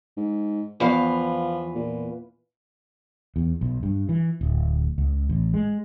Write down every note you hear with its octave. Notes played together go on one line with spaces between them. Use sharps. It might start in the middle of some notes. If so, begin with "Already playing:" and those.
G#2
E2 F3 B4 F5
A#2
E2
B1
G2
E3
D1
C#2
A1
G#3